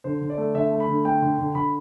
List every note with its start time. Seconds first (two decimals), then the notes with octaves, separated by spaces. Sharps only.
0.04 D3 C5
0.21 D3
0.30 D5
0.38 A3
0.55 D3 E5
0.71 A3
0.80 B5
0.88 D3
1.05 A3 G5
1.22 D3
1.38 D3
1.55 D3 B5